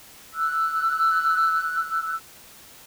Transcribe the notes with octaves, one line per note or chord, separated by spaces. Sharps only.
E6 F#6